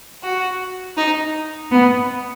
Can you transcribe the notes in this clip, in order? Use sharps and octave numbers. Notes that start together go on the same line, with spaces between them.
F#4
D#4
B3